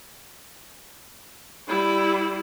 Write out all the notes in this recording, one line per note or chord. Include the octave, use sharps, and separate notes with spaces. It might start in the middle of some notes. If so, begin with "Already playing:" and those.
G3 E4